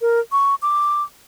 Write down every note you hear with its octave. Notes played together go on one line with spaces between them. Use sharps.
A#4
C#6
D6